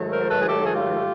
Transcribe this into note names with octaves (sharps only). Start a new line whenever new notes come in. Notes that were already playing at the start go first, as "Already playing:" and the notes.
Already playing: G#2 D#3 F#3 A3
A#4 C5
A4 B4
G#4
G4 A4
G#4
F4 G4